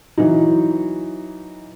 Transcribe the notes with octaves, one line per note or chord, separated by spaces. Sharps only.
E3 F#3 D#4